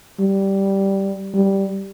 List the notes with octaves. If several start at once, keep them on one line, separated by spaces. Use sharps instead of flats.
G3
G3